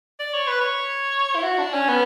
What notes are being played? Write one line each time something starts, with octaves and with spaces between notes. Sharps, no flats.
D5
C#5
B4
C#5
E4
F#4
D4
C#4
B3